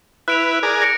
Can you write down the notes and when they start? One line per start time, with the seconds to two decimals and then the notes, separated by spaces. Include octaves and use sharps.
0.28 E4 B4 F#6 D7 F7
0.63 G#4 A#4 D5
0.82 A#6 C#7 D7